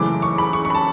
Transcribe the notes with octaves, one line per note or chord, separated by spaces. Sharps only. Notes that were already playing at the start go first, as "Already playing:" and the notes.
Already playing: F#1 F#2 C#3 E3 A3 D6
C#6
B5
C#6
C#6
B5
A5